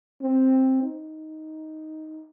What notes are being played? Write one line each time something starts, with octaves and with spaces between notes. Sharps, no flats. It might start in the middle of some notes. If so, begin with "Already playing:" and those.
C4
D#4